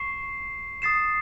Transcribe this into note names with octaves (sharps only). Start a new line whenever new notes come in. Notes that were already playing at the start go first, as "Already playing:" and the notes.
Already playing: C#6 C7 E7
D#6 A6 C7 E7